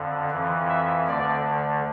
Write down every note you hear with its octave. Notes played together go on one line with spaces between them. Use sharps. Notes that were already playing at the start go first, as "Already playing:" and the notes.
Already playing: F2 D3
F2 E3
E5
D2 D3 D5